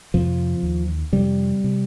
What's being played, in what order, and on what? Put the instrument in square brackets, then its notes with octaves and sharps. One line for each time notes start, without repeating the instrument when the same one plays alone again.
[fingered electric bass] F2 C3 F3
D#2
F2 C3 G3
C3